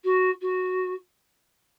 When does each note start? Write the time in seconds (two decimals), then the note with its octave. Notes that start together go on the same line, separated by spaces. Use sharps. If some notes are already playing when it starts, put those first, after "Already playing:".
0.04 F#4
0.41 F#4